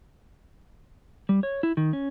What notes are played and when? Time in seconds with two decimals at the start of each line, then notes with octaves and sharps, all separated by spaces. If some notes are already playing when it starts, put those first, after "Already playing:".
1.29 G3
1.43 C#5
1.63 E4
1.77 D#3
1.93 C#4